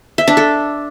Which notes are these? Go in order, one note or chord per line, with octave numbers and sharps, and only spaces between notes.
E5
D4
A4